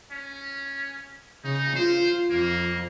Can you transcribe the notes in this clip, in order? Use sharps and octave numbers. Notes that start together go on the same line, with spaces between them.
C#4
C#3 D#4
F4 C5
F2 A#3